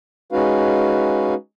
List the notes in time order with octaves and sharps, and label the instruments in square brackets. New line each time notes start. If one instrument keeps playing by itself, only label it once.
[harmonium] G#3 C#4 D#4 F#4 B4 F5